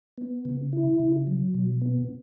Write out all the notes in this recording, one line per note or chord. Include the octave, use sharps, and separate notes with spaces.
B3
C#3
E4
C#3
F#3
B2
B3